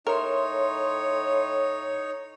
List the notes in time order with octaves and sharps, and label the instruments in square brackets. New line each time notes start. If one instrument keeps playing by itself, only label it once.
[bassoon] A2 [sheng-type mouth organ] D#4 C#5 [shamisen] A#4 [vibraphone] E5 C6